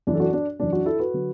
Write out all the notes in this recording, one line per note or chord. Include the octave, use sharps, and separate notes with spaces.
F#2 E3 D4
A4
D4 F#4
D4
F#2 E3 D4
D4 F#4
E4 A4
F#4 B4
D3 F#3